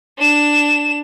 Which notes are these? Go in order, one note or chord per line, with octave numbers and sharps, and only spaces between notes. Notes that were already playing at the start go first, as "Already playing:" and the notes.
D4 E7